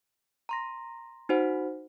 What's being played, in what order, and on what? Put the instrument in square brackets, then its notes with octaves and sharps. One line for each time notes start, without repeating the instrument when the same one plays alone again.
[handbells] A#5 C6 A#6
D#4 F#4 C5 F#5